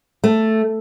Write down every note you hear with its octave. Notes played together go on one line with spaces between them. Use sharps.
A3